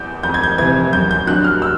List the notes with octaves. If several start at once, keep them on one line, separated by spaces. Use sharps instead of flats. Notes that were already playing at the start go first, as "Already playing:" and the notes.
Already playing: E2 G6
F2 G6
G#6
G6
C3 E3 G#6
F#2 G6
G6
D3 F#3 F#6
F6
E6